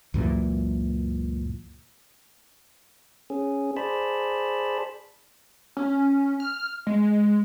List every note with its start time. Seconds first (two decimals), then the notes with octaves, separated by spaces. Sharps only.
0.14 C#2 F#2 A#2 E3
3.30 C#4 G#4
3.77 G#4 C5 D5 A5 B5
5.77 C#4
6.40 F6
6.87 G#3